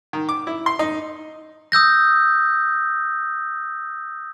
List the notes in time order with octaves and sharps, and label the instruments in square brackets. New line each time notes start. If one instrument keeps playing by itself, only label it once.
[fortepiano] D#3
D6
E4
C6
D#4
[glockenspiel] D#6 E6 G6 A#6